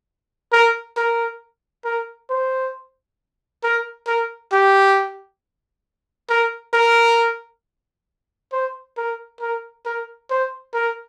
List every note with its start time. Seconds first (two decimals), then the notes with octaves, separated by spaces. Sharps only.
0.52 A#4
0.97 A#4
1.85 A#4
2.30 C5
3.63 A#4
4.07 A#4
4.53 G4
6.29 A#4
6.74 A#4
8.52 C5
8.97 A#4
9.41 A#4
9.86 A#4
10.31 C5
10.74 A#4